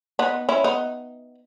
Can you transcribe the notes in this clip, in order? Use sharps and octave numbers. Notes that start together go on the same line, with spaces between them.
B3 D#4
C#4 E4
B3 D#4